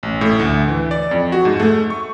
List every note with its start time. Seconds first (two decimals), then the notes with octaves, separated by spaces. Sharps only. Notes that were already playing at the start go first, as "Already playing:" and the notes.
0.03 A1
0.21 A2
0.39 D2
0.68 E3
0.91 D5
1.11 F2
1.32 F#4
1.45 G#2
1.60 A3
1.90 C#6